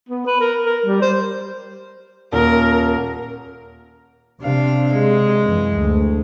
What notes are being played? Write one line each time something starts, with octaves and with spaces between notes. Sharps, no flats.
B3
B4
A#4
A#4
G3
C5
D#1 A#4
C3 D4 F5
G#3
F#2 E3
D2